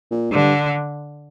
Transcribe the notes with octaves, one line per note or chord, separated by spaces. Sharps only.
A#2
G2 D3